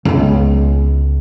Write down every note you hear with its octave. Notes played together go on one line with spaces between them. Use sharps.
C#2 B3